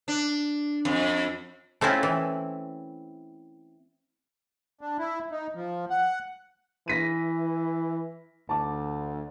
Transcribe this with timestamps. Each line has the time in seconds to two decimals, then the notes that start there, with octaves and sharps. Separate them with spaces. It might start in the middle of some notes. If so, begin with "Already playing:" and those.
0.08 D4
0.85 F2
1.81 A3 C4 C#4 E4 F4
2.03 E3
4.81 D4
4.99 E4
5.32 D#4
5.55 F3
5.90 F#5
6.88 E3 A#6 B6 D#7
8.49 D2 A5 D6